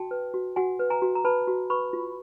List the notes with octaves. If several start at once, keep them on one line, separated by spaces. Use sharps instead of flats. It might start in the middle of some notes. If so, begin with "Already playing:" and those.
Already playing: F#4 G5 A5
B4
F#4
F#4 F#5 G#5
B4
G#5 A#5
F#4
A#5
B4 A5 B5
F#4
B4 B5 C#6
F4